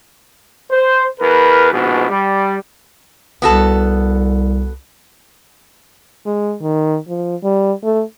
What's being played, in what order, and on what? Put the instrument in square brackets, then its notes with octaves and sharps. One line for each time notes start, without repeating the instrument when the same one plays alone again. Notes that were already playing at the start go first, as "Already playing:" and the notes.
[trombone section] C5
E2 A#4 B4
A#1 G#2 B2
G3
[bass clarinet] C2 [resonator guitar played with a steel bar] B3 F#4 A4
[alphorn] G#3
D#3
F3
G3
A3